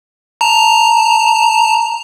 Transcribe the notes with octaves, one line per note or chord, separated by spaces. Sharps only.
A5 A#5